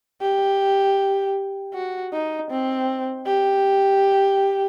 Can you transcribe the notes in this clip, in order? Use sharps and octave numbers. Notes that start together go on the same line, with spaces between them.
G4
F#4
D#4
C4
G4